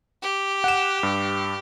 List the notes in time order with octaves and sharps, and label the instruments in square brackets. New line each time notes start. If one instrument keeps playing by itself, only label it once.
[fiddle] G4
[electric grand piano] F#5 E7
G2